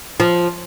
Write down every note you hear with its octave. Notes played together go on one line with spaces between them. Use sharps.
F3